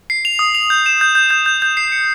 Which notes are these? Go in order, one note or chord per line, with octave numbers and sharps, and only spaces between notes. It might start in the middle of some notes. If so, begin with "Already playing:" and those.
C7
F7
D#6
F7
G6
E7
G6
G6
G6
G6
G6
C7
C#7